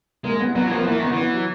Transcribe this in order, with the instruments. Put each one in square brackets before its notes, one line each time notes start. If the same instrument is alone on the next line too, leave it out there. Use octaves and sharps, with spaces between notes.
[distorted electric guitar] G#3 [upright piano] A#3
[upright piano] B3
[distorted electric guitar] F#3 [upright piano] B3
[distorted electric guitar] E3
[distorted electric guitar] F3 [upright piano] A#3
[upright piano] B3
[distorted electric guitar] E3 [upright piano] A#3
[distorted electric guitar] D#3 [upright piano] B3
[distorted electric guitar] E3
[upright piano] B3
F#3